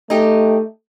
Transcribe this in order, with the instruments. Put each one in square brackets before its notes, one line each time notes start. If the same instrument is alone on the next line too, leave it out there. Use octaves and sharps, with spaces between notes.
[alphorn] A3 [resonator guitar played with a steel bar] D#4 G4